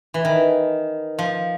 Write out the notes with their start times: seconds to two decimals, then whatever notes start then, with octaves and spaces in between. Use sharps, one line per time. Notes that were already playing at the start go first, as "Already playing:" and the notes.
0.14 E3
0.25 D#3
1.19 F3